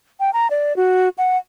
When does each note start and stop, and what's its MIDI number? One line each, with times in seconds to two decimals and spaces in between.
0.20 0.30 79
0.33 0.47 82
0.50 0.76 74
0.76 1.09 66
1.18 1.37 78